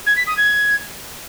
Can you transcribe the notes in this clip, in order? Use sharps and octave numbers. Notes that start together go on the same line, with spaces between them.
G#6
B6
D#6
G#6